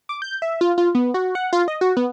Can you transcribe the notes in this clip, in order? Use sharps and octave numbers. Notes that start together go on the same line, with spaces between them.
D6
G6
E5
F4
F4
B3
F#4
F#5
F4
D#5
F#4
B3